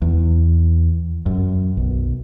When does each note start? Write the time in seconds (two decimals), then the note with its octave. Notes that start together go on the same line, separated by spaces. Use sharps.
0.02 E2
1.26 F#2
1.77 B1